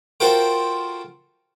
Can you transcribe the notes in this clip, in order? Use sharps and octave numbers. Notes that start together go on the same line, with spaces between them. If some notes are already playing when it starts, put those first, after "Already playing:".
F4 F#4 A4 A#4 C5 G5